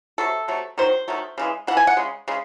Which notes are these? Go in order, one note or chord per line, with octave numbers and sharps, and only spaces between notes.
C3 F#3 A3 A4
C3 F#3 A3
D#3 F#3 C5
D#3 F#3 A3
C#3 E3 G#3
C#3 E3 F#5
G#5
F#5
C#3 G#3
C#3 G#3